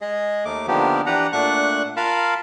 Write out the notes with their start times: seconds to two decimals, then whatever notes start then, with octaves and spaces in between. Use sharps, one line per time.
0.01 G#3 G#4 D#5
0.45 D#2 A3 A#3 D6
0.68 D3 D#3 F3 A#3 B3 G4
1.06 E3 D4 G4 B4 F#5 A#5
1.33 A#2 A3 D4 F#5 C#6 F#6
1.96 F4 A#4 F5 A5 B5